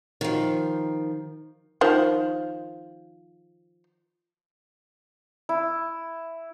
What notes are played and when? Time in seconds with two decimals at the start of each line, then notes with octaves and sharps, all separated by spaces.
0.21 D#3 F3
1.81 D#3 F3
5.49 E4